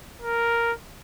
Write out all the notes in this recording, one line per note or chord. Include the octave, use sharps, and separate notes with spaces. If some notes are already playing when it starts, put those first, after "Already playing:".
A#4